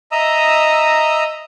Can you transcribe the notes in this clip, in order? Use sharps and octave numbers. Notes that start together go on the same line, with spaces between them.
D#5 E5 A#5 D#6 E6